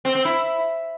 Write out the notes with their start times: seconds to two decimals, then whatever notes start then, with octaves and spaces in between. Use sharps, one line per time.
0.05 C4
0.15 C4
0.25 E4